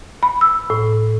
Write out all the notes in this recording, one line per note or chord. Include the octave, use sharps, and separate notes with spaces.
B5
E6
A2